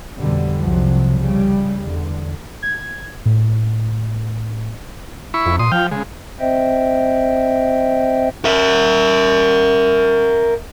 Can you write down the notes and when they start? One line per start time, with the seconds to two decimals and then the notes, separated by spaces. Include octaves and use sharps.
0.18 F2 B2 D3 G3
0.62 C2 C3 F3 F#3
1.20 C#3 G3
1.81 E2 D3
2.63 G#6
3.26 A2
5.34 E4 B5 C#6
5.46 F2
5.59 A#2 C6 D#6
5.72 F3 F5 G5
5.92 C#3 G#3
6.40 C4 C5 D#5 E5 G5
8.45 A#4 E5